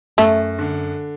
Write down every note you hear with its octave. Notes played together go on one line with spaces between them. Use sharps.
F#2 A3
D3